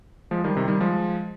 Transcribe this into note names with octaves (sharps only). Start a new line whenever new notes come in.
F3 G#3
D#3 G3
C3 D#3
D#3 G3
F3 G#3